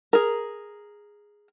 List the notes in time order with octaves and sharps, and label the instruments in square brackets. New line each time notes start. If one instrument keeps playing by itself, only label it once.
[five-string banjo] G#4 A#4